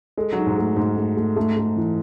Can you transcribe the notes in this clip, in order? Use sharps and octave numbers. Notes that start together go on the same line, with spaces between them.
G#3 A4
F#3 D#4
G#2
A3
G#2 A3
A3
A3
A3
A3
E3